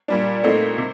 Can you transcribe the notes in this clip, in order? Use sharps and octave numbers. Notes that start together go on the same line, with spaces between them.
A#2 G3 D4
A#2 A3 C4 D#4
C3